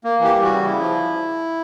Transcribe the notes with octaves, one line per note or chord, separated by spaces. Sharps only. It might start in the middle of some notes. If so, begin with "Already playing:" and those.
A#3
E3 G4
G3
C#3 F#4
C#3 E4
F3